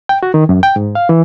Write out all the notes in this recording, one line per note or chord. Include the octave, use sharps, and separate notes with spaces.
G5
F#4
D#3
F#2
G5
G#2
F5
E3